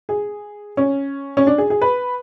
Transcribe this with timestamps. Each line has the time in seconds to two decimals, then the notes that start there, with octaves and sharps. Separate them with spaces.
0.09 G#4
0.77 C#4
1.37 C#4
1.47 D4
1.58 G#4
1.70 G#4
1.82 B4